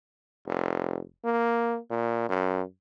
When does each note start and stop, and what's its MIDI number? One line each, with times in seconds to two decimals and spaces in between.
0.46 1.00 29
1.25 1.78 58
1.90 2.27 46
2.29 2.62 42